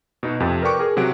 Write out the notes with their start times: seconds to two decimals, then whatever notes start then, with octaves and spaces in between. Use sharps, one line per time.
0.23 B2 D#4 F#4
0.40 F2 C3 A4
0.62 A#4 B4 D5 G5 C#6 D6
0.79 G#4 A#4
0.97 C3 F#3 F#5 D7